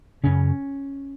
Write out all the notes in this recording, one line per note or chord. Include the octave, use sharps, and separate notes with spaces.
F#2 C#3 C#4